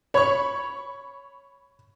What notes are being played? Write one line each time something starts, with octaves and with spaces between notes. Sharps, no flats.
C#5 B5 C#6